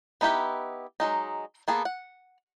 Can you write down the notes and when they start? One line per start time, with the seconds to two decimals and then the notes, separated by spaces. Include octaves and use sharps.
0.21 B3 D#4 E4 G4 B4
1.00 F#3 G#3 D#4
1.68 A#3 B3 G#4 A4
1.85 F#5